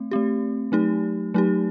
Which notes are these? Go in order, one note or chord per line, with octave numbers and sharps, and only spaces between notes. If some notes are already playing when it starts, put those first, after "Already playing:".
Already playing: A3 C4
A3 C4 G4
F#3 A3 D#4 G4
F#3 A3 D#4 G4